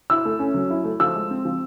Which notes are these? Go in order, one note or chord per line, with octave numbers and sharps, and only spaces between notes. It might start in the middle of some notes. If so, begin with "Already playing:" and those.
E4 E6
A3
C#4
F#3
E4
A3
F3 E6
G#3
C4
F3